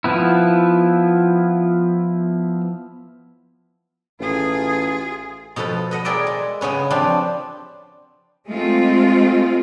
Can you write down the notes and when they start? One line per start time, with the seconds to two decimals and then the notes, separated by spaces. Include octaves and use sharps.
0.04 F3 B3 E4
4.20 A1 F4 G#4
5.56 B2 F3 A4 B4
5.91 B4 D#5 F#5
6.05 G#4 A#4 D5 E5 G5
6.27 G#3
6.61 C#3 B3 C#4 B4
6.90 F3 C4 D4 G4 B4
8.47 G#3 A3 C4 F4